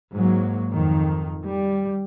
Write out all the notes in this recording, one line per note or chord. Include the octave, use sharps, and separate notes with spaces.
G#2 F#3 A#3
F2 D#3
G3